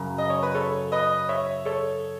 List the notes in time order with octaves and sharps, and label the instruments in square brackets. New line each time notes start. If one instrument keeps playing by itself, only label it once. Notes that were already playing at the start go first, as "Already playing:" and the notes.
Already playing: [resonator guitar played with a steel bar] F#2 C#3
[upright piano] D#5
C#5
B4
A4 C#5
B4 D#5
C#5 E5
A4 C#5